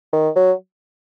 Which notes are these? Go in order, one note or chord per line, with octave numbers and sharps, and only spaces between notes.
D#3
F#3